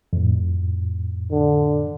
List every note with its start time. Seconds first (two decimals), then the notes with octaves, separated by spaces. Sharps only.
0.13 F2 A2
1.32 D3